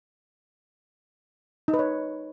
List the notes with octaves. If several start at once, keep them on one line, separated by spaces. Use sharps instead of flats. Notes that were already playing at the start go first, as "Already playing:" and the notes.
D#4
B4
C#5